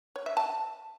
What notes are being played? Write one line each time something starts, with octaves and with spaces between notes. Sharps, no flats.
C#5
E5
A5